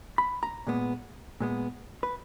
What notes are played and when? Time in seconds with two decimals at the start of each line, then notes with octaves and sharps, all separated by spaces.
0.18 B5
0.43 A#5
0.67 A#2 G#3 B3
1.40 A#2 G#3 B3
2.03 B4